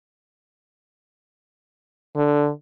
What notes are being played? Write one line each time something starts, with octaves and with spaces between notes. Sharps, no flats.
D3